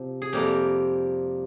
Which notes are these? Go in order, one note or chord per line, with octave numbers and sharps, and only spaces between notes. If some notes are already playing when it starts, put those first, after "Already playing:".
Already playing: C3 F3
G#4
F2 C3 G3 A#3 G4